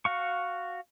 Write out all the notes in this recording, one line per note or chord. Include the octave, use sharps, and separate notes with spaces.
F#4 F5 C#6